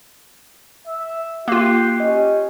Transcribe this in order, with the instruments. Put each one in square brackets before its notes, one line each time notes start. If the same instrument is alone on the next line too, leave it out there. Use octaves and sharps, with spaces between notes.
[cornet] E5
[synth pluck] A#3 F4 [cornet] G4 [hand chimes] F#6 C7
[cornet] C#4 [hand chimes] G4 D#5